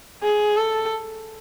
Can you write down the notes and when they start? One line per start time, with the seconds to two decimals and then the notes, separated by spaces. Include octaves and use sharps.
0.23 G#4
0.57 A4